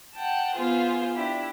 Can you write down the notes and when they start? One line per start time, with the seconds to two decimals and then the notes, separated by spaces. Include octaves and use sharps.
0.15 F#5 G5 A5
0.55 B3 F4 G#4 C5
1.15 D4 E4 G4